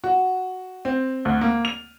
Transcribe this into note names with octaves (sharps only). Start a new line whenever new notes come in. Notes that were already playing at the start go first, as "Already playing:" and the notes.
F#4
C4
D2
A#3
F7